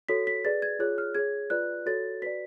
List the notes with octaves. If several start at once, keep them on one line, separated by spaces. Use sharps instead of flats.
F#4 A4 C#5 B6
B6
G#4 B4 D5 A6
G#6
F4 G#4 C#5 F#6
F6
G#4 C#5 G#6
F4 B4 D5 F#6
F#4 A4 C#5 A6
F#4 B4 D5 B6